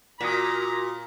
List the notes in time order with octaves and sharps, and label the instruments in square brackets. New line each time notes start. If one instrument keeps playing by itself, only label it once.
[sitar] A#2 [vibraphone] F4 F#4 A#4 [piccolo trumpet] A#5 [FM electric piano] D#6 A#6 B6